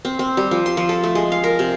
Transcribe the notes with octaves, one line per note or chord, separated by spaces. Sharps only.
C4
C4
G3
F3
C6
F3
A4
A3
G#3
F5
A#4
C3